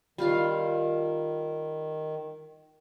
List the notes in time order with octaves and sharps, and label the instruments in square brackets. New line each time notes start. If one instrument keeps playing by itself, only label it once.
[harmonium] D#3 [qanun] G3 F4 F5